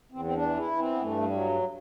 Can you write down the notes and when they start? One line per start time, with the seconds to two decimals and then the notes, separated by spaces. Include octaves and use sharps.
0.12 E2 C4
0.25 C4
0.34 D4
0.42 E3
0.57 E4
0.71 E3
0.79 C4
0.93 B3
1.01 G2 A3
1.24 G3
1.31 F#3